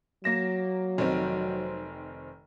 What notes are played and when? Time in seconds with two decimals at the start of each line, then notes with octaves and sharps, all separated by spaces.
0.24 F#3 A#3 A#6 E7
0.98 F1 D#3 C4